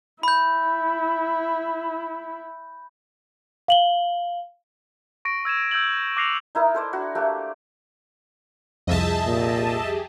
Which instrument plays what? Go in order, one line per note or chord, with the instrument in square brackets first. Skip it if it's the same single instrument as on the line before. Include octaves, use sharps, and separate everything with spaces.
[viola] E4 [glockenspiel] B5 G6
[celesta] F5 F#7 G7
[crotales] C#6 A#6 D7
E6 G#6 D#7 E7
E6 G6 G#6 F#7
D6 F#6 A#6 C7 C#7 F7
[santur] D#4 E4 A#4 D#5
A4 C5 D5
D4 F#4
A3 A#3 G4
[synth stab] C2 F2 [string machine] G#4 G6 [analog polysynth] D#5 E5 A5
[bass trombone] A#2 [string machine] G4 G#4